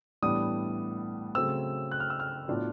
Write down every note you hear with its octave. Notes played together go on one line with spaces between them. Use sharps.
A2 E3 G3 B3 D4 D#6
C#3 F#3 A3 C4 E6
F#6
F6
E6
F6
A2 F#3 B3 D4 F4